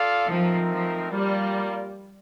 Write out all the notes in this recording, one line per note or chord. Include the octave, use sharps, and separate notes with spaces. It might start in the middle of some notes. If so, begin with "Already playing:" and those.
Already playing: F4 A4 D5 F5
F3 A3 C4 D#4 A#4
F3
G3 A#3 F4 A#4 D5 F5